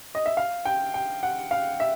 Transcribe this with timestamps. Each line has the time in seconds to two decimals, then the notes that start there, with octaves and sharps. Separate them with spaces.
0.15 D#5
0.26 E5
0.37 F5
0.65 G5
0.94 G5
1.23 F#5
1.51 F5
1.80 E5